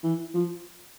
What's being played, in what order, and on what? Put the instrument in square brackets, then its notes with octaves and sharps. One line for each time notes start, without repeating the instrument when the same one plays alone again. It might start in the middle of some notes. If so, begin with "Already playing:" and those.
[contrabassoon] E3
F3